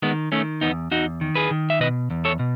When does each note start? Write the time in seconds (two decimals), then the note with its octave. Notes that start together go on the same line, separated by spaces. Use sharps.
0.02 D#3 G#3 B3
0.32 D#3 A3 C#4
0.61 E2 B3 D#4
0.91 E2 D#4 F#4
1.21 D#3
1.35 G#4 B4
1.51 D#3
1.70 E5
1.80 B2 B4 D#5
2.10 E2
2.25 A4 C#5
2.39 B2